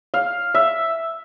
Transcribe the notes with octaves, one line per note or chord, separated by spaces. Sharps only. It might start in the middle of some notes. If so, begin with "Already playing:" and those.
F5
E5